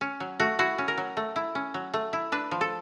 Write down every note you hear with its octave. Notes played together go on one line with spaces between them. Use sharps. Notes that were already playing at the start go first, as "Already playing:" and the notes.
C#4
F#3
A3 F#4
E4 F#4
C#4
A#4
F#3
A3
E4
C#4
F#3
A3
E4
D4 B4
F3
A4